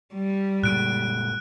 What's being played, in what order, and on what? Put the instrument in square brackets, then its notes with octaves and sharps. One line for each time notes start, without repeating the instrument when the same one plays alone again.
[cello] G3
[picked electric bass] A#2 G#3 [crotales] F#6 D7